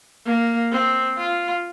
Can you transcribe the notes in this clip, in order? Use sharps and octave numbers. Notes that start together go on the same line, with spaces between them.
A#3
C4
F4